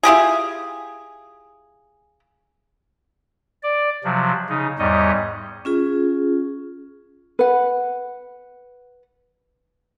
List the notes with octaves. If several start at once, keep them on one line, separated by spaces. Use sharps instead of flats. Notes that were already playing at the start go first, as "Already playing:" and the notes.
E4 F4 G4 G#4
D5
C3 F3 F#3
C#3 D#4
E2 G#2 G3 C#5 D#5
C#4 F4 G#4
B4 F#5